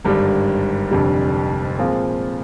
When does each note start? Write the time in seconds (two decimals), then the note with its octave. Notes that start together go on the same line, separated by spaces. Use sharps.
0.05 G#1 G2 D3 G3
0.91 F1 F2 D3 G3
1.78 A#2 F3 G#3 C4 F4